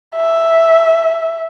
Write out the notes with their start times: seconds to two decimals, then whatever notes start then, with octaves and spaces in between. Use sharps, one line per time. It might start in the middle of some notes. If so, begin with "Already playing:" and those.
0.16 E5